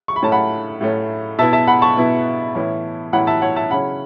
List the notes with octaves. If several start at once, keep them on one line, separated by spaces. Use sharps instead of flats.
C#6
B5
A2 A3 C#4 A5
F#5 B5
A2 A3 C#4
B2 B3 E4 E5 A5
E5 A5
F#5 B5
A5 C#6
B2 B3 E4
A2 E3 C#4 E4
A2 E3 C#4 E4 F#5 B5
E5 A5
C#5 F#5
E5 A5
C#3 F#3 C#4 E4 F#5 B5